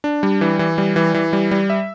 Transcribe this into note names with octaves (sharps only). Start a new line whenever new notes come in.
D4
G3
E3
E3
G3
E3
E3
G3
G3
E5